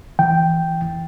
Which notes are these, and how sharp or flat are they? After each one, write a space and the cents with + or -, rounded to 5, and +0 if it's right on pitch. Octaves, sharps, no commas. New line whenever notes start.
E3 +0 G5 +0